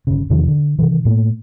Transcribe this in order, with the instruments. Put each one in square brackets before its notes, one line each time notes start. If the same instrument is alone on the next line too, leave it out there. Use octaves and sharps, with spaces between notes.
[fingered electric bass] G1 C#3
E2 C3 D#3 F3
D3
C3 D#3 E3
A2 A3 A#3